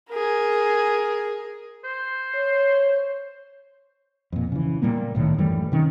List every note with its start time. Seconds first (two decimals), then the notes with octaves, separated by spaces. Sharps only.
0.10 G#4 A#4
1.84 C5
2.35 C#5
4.32 F2 A#2
4.52 C#3 E3
4.82 A#2 G3 A#3 B3
5.15 C2 A2 D#3
5.38 F#2 E3 G3 A3
5.72 C3 D#3 C#4